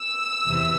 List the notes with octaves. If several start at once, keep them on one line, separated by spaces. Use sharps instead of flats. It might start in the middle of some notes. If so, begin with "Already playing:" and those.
Already playing: E6
E2 C3 E3